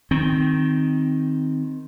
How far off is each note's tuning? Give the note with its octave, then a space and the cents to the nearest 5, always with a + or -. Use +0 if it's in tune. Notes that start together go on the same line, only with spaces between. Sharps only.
D#3 +0 C4 +0